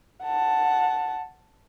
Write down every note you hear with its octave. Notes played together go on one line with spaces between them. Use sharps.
F#5 A5